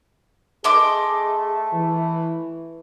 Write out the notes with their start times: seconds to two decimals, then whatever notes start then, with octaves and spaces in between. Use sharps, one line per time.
0.64 A3 G#4 D#5 C6 D6
1.74 E3